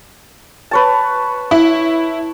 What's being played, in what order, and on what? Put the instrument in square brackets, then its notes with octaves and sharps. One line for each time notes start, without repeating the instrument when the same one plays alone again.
[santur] B4 C#5 A5
[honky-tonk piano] E4